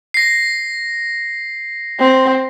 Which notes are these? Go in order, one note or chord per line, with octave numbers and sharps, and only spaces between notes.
A#6 C7
C4